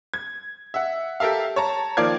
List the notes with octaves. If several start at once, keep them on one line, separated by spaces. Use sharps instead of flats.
G#6
E5 F#5
G4 A4 A#4 E5 F5
C#5 A5 A#5
D#3 F3 A#3 D5 F5 G#6